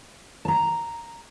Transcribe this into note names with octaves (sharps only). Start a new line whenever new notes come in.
A5 A#5